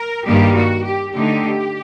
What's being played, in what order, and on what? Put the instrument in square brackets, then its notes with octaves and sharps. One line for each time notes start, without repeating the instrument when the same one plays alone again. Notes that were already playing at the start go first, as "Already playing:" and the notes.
Already playing: [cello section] A#4
G2 D#3 G3 A#3 G4
F#4
G4
D3 A3 D#4 G4